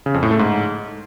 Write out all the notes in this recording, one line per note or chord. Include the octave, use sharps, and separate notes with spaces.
C#3
F2
A2
A3
G#2